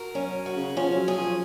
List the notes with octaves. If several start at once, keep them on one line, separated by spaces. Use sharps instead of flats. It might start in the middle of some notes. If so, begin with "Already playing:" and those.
Already playing: F#4 A#4
F#2 C#4
F#4
C#3
F3 C#4
F#3
G#4
F3